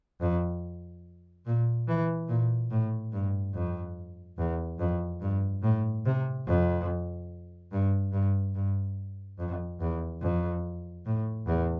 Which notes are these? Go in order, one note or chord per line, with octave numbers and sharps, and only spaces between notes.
F2
A#2
E3
A#2
A2
G2
F2
E2
F2
G2
A2
C3
F2
G2
G2
G2
F2
E2
F2
A2
E2